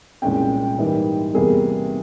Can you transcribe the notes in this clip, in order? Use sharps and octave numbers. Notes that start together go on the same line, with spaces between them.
C2 A#2 G#3 C#4 G5
G#2 E3 G3 A#3
E2 C3 G3 A#3 G#4